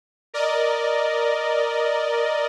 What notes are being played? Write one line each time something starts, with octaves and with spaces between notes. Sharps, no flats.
A#4 D5 D#5